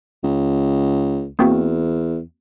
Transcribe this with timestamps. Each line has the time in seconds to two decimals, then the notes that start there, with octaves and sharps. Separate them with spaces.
0.24 C#2
1.39 E2 A#3 C4 F#4